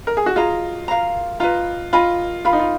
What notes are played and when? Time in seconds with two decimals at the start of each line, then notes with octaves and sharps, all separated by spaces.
0.07 A#4
0.17 G#4
0.26 F#4
0.36 F4 G#4 D#5 A#5
0.88 A#4 F5 A#5
1.40 F4 B4 D#5 A#5
1.93 F4 A#4 D#5 G#5 B5
2.45 F4 A#4 F5 B5
2.53 D#4
2.60 F4